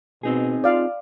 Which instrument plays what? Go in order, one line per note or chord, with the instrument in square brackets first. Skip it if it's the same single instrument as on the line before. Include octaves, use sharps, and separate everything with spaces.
[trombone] B2 [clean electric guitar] C4 D#4 G#4
[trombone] F4 [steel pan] D5 F5